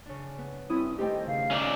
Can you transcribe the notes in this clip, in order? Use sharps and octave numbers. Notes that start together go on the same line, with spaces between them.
C#3 D4
B3
G2 C4 C#4 E4 D#6
D#3 A3 D#4 G4 C5 D#5 G5
C#3 F5
C#4 D#4 D5 E5 E6